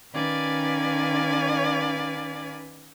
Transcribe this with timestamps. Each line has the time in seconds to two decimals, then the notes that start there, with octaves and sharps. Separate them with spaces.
0.13 D#3 C#4 B4 D5 F5 G#5